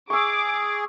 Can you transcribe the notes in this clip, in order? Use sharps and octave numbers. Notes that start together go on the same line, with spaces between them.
G#4 C#6 D6 E6